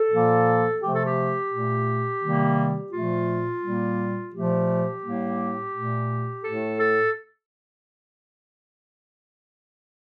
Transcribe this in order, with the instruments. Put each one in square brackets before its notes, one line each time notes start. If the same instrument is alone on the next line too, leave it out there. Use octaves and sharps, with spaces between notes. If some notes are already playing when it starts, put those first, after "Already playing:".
Already playing: [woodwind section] A4
A#2 F3 A#3
C3 F3 A3 G4
A4
G4
A#2 A3
C3 D#3 G3 A#3
A#2 F3 A3 F4
A#2 G3 A#3
A#2 F3 A3 G4
A2 G3 A#3
A#2 A3
A2 A3 A4
A4